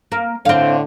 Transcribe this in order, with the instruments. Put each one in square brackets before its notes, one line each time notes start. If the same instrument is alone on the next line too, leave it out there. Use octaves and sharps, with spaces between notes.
[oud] A#3
[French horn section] A2 D3 [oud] C4 F5